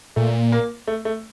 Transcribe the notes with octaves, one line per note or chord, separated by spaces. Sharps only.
A#2 A3
A#3
A3
A3